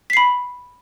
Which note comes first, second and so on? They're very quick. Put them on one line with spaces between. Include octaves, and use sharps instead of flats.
B6 C7 B5